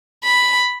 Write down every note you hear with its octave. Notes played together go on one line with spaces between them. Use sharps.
B5